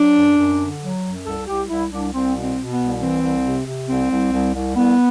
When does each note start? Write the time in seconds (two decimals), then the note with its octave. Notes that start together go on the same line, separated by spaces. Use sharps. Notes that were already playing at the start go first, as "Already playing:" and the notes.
Already playing: F#3 D4
0.15 F#2
0.37 F#2
0.59 D3
0.81 F#3
1.03 F#2
1.25 C2 A4
1.47 C2 G4
1.68 C2 E4
1.91 C2 D4
2.13 C2 C4
2.35 B2
2.42 C4
2.56 B2
2.71 B3
2.79 C2
3.00 E3 C4
3.22 C2
3.44 C3
3.66 C3
3.88 C2 C4
4.10 C2
4.32 C2
4.54 C2
4.75 C2 B3